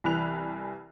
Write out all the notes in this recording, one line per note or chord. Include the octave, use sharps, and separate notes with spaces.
C2 E3 B5 F#6 F7